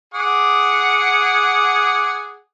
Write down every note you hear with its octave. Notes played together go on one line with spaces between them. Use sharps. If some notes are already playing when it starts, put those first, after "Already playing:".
G#4 F#5 D6